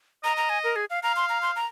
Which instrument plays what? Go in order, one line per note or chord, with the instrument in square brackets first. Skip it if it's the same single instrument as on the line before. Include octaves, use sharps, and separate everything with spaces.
[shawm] D#5 [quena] A#5
[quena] A#5
G#5
A#4
G#4
F5
[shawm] F5 [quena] A#5
[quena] C6
A#5
C6
A#5